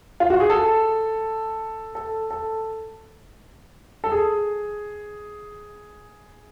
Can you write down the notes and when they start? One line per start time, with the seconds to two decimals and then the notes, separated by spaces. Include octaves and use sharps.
0.20 F4
0.30 F#4
0.40 G#4
0.50 A4
1.95 A4
2.31 A4
4.04 A4
4.12 G#4